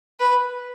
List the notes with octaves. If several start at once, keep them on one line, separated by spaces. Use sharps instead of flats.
B4